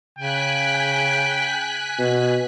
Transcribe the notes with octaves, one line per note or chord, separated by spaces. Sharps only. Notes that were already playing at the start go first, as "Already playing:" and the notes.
C#3 G5 G#5 F#6 B6
B2